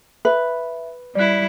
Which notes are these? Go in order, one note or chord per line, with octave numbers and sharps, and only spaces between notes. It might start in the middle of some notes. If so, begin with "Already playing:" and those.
B4 E5
G3 E4 D5 F#6